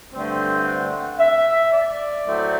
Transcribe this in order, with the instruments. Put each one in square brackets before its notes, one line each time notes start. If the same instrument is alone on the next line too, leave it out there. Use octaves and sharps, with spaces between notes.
[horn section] G2 D3 A3 C4
F#5
E5
D5
A2 F#3 A3 C4